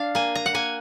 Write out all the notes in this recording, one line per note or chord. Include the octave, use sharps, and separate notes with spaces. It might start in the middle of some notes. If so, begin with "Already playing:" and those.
Already playing: D4 F5
A#3 G#5
A#5
F#5
A#3 G#5